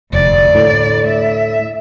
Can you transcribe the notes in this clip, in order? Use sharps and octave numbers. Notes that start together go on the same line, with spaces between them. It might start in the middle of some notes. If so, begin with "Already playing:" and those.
F1 D2 D5
A2
E5